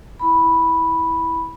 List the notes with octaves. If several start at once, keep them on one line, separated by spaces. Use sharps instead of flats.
E4 B5